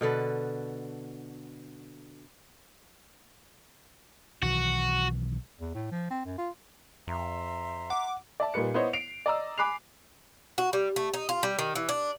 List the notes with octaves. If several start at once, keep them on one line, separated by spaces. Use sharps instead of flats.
B2 D3 A4 B4
B1 D#3 E3 F#4
E2
A2
F3
C4
F#2
F4
F2 E5 A#5 C6
F#5 D6
D5 E5 A5
A#2 G3 D#4 B4 C#7
B3 E4 C5 C#5 D#5
C7 D7 F7
D5 D#5 A#5 E6
G#5 B5 D6 F#6 C7 F7
F#4
G3
A3
D#4
F4
G3
D#3
E3
D4